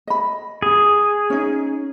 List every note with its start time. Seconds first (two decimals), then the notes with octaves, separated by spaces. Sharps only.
0.07 D#5 B5
0.62 G#4
1.30 C#4 D#4